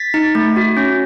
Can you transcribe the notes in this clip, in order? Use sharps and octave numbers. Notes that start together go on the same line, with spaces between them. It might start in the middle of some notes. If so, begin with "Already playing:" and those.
Already playing: A6 B6
D#4
A3
F#4
C#4